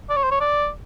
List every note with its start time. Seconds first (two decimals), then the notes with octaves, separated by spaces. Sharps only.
0.09 D5
0.16 C#5
0.23 C5
0.31 C#5
0.40 D5